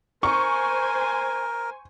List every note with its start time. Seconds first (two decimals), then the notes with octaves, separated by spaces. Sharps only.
0.23 A#4 C5 G#5 C#6